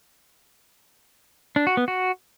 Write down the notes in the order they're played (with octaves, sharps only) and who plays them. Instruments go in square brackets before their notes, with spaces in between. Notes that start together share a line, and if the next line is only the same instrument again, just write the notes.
[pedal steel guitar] D4
F#4
B3
F#4